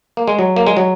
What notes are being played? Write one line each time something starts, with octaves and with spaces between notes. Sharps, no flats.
A#3
G#3
F#3
A#3
G#3
F#3